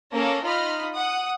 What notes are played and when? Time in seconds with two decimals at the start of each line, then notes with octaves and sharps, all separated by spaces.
0.13 A#3 C#4 A4 A#4
0.44 D#4 F4 D#5 B5 F6
0.95 F#5 D#6